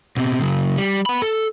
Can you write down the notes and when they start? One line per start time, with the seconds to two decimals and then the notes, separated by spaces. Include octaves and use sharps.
0.17 B2 C4
0.42 C#3 F#3
0.77 G3
1.06 B3 B5
1.22 A4